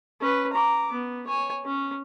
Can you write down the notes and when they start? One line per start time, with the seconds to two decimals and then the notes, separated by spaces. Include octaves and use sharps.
0.21 C#4 B4
0.53 A#5 D6
0.92 B3
1.27 C#5 G#5
1.65 C#4